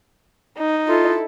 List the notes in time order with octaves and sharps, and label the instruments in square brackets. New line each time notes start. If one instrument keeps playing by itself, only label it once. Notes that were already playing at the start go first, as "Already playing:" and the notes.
[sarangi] D#4
[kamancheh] E4 A4 [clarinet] F4